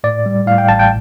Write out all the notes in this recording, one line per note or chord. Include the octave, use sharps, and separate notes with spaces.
A2 D5
G3
A2 F5
G5
A1 A5
G5